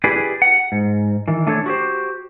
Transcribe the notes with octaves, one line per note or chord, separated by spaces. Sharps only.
E4 G4 G#4 B4 D5
F#5
G#2
D#3 E3
A3 D4 A4 C5 C#5
F#4 G4 C5